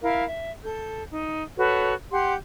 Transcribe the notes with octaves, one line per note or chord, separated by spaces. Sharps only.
E4 A#4 E5 F5
E5
A4 G6
D#4
F#4 A4 B4 C#5
G4 F#5 C6 G6